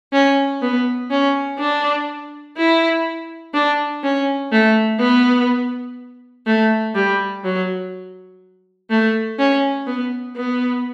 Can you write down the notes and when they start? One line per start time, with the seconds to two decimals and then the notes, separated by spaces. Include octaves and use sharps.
0.13 C#4
0.62 B3
1.11 C#4
1.59 D4
2.57 E4
3.53 D4
4.03 C#4
4.52 A3
4.99 B3
6.46 A3
6.95 G3
7.44 F#3
8.90 A3
9.38 C#4
9.87 B3
10.36 B3